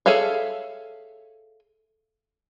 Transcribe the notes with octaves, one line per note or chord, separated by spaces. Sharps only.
G#4 A4 C#5 E5 F5